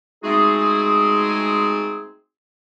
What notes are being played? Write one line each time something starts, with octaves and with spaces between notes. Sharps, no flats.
G#3 A3 C4 D#4 F#4 G#4